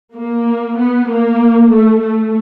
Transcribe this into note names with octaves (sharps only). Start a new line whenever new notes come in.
A#3
B3
A#3
A3
A3